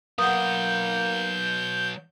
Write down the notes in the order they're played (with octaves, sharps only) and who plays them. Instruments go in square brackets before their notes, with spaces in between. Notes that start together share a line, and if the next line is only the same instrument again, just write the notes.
[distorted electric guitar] F#3 B4 [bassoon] A#3 [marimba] F#5 D#6 [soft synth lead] G6